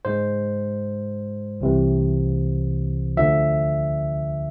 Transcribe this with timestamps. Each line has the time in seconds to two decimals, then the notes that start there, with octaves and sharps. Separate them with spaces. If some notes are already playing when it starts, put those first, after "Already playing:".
0.05 G#2 G#3 C5
1.61 C2 C3 E3
3.17 D2 D3 F3 E5